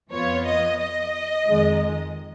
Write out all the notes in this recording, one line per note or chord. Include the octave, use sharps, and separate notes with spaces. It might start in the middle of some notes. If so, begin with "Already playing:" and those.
F2 F3 B3 F4 C#5
D#5
D#5
F2 D#3 G#3